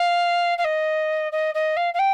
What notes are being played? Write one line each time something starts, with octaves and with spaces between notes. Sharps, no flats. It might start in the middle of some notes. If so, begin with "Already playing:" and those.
Already playing: F5
F5
D#5
D#5
D#5
F5
F5
G5